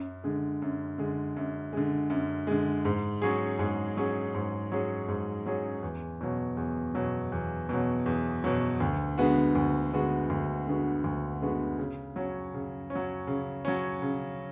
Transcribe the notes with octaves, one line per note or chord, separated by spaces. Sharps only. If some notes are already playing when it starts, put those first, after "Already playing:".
Already playing: F#2
D3 G#3
F#2
D3 G#3
F#2
D3 G#3
F#2
D3 G#3
G#2
F#3 C#4 G#4
G#2
F#3 C#4 G#4
G#2
F#3 C#4 G#4
G#2
F#3 C#4 G#4
E2
B2 F#3
E2
B2 F#3
E2
B2 F#3
E2
B2 F#3
D2
D3 G#3 B3 F#4
D2
D3 G#3 B3 F#4
D2
D3 G#3 B3 F#4
D2
D3 G#3 B3 F#4
C#3
F#3 C#4
C#3
C#4
F#3
C#3
F#3 C#4
C#3